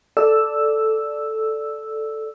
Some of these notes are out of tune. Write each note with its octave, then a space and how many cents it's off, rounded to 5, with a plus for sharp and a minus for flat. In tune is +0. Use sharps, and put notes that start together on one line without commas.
A4 +0 D5 +0 E6 +0